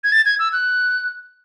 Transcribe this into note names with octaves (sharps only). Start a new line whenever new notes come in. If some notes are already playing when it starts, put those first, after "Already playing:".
G#6
A6
G#6
E6
F#6